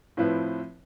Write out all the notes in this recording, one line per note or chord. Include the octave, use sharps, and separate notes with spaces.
A2 F3 C4 E4 B4